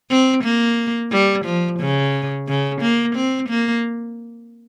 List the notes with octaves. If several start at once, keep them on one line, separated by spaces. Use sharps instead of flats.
C4
A#3
G3
F3
C#3
C#3
A#3
C4
A#3